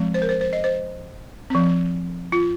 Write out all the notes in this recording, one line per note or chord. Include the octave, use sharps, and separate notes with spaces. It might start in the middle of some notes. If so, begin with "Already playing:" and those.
Already playing: F3 G#3 C4
C5
A#4
C5
C5
D#5
C5
F3 C4
F4